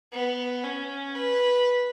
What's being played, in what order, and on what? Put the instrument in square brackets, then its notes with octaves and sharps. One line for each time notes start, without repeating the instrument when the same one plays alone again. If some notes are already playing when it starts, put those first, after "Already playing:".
[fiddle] B3
C#4
B4